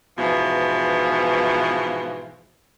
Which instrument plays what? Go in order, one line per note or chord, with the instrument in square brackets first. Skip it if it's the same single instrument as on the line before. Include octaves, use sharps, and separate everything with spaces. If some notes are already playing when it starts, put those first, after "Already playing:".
[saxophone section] G#2 B2 E3 F3